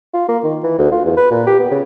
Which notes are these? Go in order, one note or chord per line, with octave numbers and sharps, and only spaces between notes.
F4
A#3
D#3
E3
D2
F4
E2
B4
A#2
G4
B3
C#3